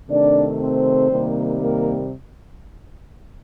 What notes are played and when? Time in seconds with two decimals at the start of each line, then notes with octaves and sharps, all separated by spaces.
0.09 C3 D#3 A3 D4 D5
0.59 C4 C5
1.10 C3 D#3 G3 A#3
1.61 A#3 A#4